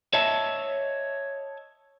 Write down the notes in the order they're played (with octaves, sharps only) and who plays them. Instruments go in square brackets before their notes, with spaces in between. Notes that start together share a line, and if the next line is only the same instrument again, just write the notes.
[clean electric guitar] C#5 D#5 E5 A5